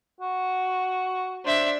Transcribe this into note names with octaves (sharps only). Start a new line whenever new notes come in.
F#4
D4 C5 E5